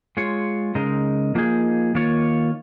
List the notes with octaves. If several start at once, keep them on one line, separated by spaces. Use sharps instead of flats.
G#3 F4 C#5
C#3 G#3 D#4 A#4
F3 A#3 D#4 G#4
D#3 A#3 F4 C#5